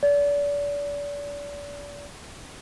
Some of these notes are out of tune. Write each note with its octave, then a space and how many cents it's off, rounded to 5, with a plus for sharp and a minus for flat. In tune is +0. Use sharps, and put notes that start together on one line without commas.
D5 -35